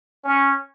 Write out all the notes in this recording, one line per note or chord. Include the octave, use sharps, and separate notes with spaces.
C#4